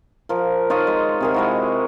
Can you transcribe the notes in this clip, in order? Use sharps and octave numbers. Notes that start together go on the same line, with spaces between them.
F3 A#4
D#4 F4 C#5 D#5
G#3
C3 G#4 A#4
G#3 E4 F#4